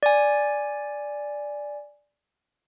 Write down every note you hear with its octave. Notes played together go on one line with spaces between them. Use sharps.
D5 G#5